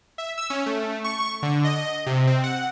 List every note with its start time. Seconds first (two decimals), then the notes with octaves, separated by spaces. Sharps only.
0.18 E5
0.38 E6
0.50 C#4
0.66 A3
1.04 C#6
1.42 D3
1.65 D#5
2.06 C3
2.27 C4
2.44 F#5